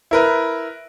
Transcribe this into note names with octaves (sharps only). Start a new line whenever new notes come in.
E4 A#4 B4